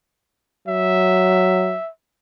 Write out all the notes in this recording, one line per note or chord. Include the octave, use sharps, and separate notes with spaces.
F#3 E5